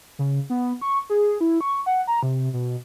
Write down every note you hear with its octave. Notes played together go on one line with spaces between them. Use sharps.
C#3
B3
C#6
G#4
E4
C#6
F#5
A#5
C3
B2